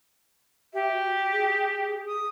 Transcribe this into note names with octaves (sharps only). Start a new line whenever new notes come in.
G4 E5
F#4
G#4
D#6